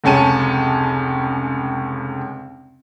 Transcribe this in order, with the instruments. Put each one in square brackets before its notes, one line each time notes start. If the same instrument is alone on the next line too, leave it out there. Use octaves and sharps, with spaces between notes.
[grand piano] F1 C#2 C#4 A5 D#7